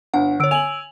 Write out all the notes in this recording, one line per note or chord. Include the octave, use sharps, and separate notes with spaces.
G1 D4 F#5
D3 C#5 E6 D7
G#5 F7 F#7